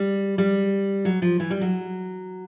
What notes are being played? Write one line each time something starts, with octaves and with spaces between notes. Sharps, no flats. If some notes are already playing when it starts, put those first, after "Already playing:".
Already playing: G3
G3
F#3
F3
E3
G3
F#3